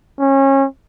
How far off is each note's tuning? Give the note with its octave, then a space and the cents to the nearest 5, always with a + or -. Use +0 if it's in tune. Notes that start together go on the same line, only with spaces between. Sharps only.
C#4 -30